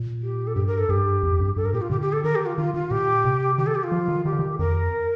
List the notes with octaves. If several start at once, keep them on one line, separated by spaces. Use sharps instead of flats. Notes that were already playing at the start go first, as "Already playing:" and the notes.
Already playing: A#2
G4
A4
G2 G4
A#4
A4
G2 G4
F2
G2
G2 A4
A#4
A#2 G4
F4
D3 G4
G4
A4
D#3 A#4
G4
F4
D#3 F4
D#3 F4
A#2 G4
C3
D#3 G4
A4
G4
F4
F3
D#3
D#3 G4
D3
D#3
F2 A#4